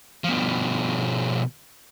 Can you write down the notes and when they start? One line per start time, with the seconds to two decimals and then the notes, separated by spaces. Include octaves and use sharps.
0.24 B2 F3